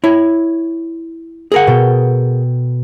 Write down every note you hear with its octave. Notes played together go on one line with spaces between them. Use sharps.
E4 C#5
G#4 A#4 F#5
B2 A4 G5